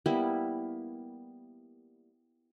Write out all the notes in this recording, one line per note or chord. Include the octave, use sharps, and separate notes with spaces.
G3 A#3 B3 E4